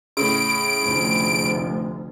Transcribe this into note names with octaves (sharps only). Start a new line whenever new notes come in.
A2 C#3 D7
F1 D2